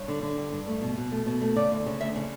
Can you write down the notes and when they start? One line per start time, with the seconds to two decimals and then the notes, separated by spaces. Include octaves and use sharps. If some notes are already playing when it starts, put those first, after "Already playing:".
Already playing: G2 C#5
0.08 D3
0.22 D3
0.37 G2
0.52 G2
0.68 A3
0.82 B2
0.97 B2
1.12 A3
1.26 B2
1.42 A3
1.56 C#3 D5
1.72 D2
1.86 C#3
2.01 D2 E5
2.16 C#3